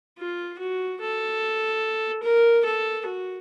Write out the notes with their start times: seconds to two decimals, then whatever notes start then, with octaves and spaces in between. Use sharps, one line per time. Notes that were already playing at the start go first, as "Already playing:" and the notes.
0.19 F4
0.59 F#4
1.01 A4
2.23 A#4
2.65 A4
3.06 F#4